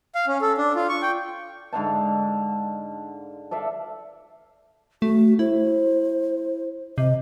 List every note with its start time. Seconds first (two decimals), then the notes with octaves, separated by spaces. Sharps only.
0.15 F5
0.27 C#4
0.41 A4
0.58 D4
0.76 F4
0.89 C#6
1.02 G5
1.73 G#2 D3 F5 A5
3.51 A4 D5 E5 F5
5.02 A3 F#4
5.39 E4 C5
6.98 C3 D#5